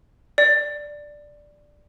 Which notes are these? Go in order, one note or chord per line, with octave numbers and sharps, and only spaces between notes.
D5